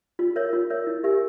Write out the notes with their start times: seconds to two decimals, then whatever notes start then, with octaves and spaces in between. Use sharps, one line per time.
0.19 F4
0.36 A#4 C#5 E5
0.53 F4
0.70 A#4 C#5 E5
0.87 E4
1.03 G4 A#4 E5 G#5